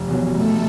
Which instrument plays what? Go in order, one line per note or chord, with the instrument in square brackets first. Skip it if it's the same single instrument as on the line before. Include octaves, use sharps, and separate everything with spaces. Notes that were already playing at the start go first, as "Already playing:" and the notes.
Already playing: [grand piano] F1
E2 B2 F#3
[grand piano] F1 [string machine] A3 A4